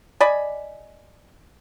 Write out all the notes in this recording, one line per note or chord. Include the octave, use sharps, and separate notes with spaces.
D5 D#5 G#5 B5